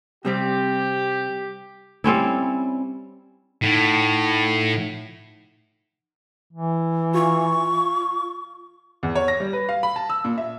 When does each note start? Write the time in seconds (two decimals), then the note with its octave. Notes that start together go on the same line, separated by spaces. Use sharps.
0.25 C3 G3 C4 G4
2.04 G3 C4 C#4 E4
3.63 A2 D#4 F#5
6.53 E3
7.14 F4 C#6
9.03 E2
9.15 C#5
9.28 A#6
9.40 G3
9.53 B4
9.69 F5
9.83 B5
9.96 A5
10.10 E6
10.24 A#2
10.38 E5